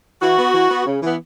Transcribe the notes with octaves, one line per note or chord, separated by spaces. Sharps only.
E3 F#4
B3
E3
B3
C#3
E3 B3